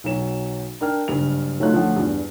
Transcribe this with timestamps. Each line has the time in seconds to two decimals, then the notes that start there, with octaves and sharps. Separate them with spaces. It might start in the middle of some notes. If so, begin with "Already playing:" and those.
0.04 B1 F#3 E7
0.81 D4 A#4 G5 F6
1.08 F#1 G2 F7
1.60 F#3 A3 D#4 F4 F#6
1.72 D2 F3 A3 C#5 F#5
1.96 E2 G2